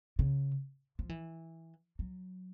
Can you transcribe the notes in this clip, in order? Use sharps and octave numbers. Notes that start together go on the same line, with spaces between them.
C#3
F3
E3
F#3